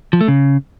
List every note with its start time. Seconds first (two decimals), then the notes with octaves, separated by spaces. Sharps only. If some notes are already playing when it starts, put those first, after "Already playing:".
0.13 F3
0.21 A3
0.28 C#3